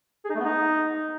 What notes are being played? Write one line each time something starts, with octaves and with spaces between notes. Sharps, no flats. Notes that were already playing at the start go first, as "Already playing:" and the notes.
G#4
D#4
A3
B3
D#4